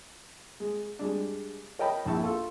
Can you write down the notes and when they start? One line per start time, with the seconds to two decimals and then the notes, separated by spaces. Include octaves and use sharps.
0.60 G#3
0.99 G3 G#3 D4
1.79 A#4 C#5 D#5 G5 A5 B5
2.05 A#1 E4 A5 C#6
2.23 F4 A4